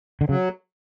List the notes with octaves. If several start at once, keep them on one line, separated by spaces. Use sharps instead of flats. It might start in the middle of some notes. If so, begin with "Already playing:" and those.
D3
C#3 F#3